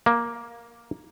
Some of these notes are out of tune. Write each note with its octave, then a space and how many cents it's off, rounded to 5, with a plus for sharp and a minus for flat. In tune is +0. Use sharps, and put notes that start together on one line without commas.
A#3 +10